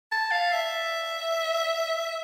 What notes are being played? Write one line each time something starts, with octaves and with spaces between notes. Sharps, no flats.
A5
F5
E5